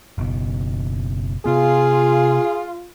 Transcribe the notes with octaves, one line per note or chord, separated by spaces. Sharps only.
F#1 B2
C3 B3 F4 G#4